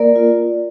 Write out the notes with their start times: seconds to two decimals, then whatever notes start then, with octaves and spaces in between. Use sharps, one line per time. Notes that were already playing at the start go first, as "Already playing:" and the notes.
Already playing: A#3 A#4 D5
0.16 F4